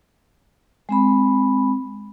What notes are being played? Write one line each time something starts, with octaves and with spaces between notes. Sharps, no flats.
G#3 C4 B5